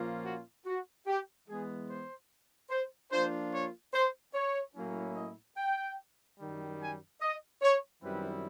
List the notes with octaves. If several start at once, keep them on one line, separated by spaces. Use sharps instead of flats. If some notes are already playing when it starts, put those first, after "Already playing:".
Already playing: A#2 F3 A#3 C#4 F4
F#4
F#4
G4
E3 G#3 B3 G#4
C5
C5
F3 A#3 D4 F4 C5
C#5
C5
C#5
A2 F#3 A#3 C#4 E4
D#5
G5
F#2 D#3 G3
G#5
D#5
C#5
F#2 D#3 G3 C4 E4 B4